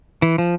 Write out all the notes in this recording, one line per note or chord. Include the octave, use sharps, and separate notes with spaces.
E3
F3